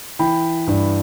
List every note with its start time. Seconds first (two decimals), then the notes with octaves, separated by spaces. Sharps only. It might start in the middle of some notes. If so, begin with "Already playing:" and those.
0.19 E3 G5 B5
0.67 G2